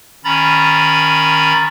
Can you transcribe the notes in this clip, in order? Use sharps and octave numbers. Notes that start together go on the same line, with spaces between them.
D#3 C#4 A#5 B5 A6